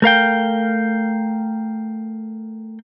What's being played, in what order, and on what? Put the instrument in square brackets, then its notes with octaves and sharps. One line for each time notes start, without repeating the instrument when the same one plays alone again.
[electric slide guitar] A3 A#4 F5 G5